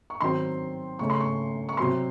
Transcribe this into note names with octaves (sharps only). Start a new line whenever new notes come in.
C#6
D#3 F#3 C4 C6
C#3 A3 C#4 C#6
C6
C#6
C#6
C3 F#3 C4 C6